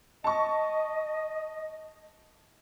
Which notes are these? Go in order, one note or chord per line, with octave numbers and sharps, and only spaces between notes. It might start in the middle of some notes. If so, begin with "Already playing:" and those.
D#5 A5 C#6